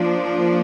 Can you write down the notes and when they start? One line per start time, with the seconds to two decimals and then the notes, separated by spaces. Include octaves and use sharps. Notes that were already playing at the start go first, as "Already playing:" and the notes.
Already playing: F3 A#3 D4